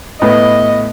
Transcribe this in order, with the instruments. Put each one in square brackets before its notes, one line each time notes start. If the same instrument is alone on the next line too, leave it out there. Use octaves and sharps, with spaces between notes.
[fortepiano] A2 B3 [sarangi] D#5